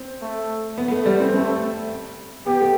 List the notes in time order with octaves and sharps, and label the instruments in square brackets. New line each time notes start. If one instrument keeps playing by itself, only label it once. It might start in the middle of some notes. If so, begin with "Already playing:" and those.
Already playing: [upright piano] C4
[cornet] A3
[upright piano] B3
B3
A3
G3
C4
[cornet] A3 [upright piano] C4
[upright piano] B3 [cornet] G4
[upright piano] A3